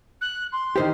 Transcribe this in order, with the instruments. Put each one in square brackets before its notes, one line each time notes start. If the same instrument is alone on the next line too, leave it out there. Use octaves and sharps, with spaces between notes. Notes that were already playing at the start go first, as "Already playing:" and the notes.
[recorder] F#6
C6
[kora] D#3 E3 [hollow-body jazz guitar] G4 C5